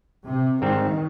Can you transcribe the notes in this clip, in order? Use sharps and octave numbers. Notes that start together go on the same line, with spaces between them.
C3
G#2 D#3 G3 C4